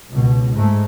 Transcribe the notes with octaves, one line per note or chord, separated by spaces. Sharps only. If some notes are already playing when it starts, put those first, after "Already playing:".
C#2 B2
G#2 G#3 A3